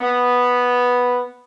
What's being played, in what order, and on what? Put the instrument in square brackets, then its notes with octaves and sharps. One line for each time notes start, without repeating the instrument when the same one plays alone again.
[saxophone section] B3